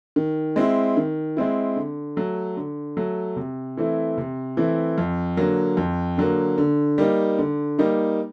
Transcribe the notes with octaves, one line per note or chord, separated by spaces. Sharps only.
D#3
G#3 C4 E4
D#3
G#3 C4 E4
D3
F#3 A3
D3
F#3 A3
C3
E3 A3 C4 E4
C3
E3 A3 C4 E4
F2
D3 F#3 A#3
F2
D3 F#3 A#3
D3
G3 A#3 D#4
D3
G3 A#3 D#4